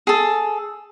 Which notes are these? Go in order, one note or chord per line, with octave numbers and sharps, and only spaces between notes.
G#4 A4